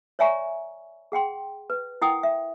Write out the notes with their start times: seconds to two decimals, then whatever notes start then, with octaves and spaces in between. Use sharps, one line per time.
0.19 C#5 D5 E5 G#5 A#5 C#6
1.12 G#4 F#5 G5 C6
1.70 B4
2.02 E4 A#4 F#5 G5 D#6
2.23 E5